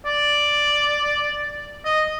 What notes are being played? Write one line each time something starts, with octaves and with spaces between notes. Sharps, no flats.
D5
D#5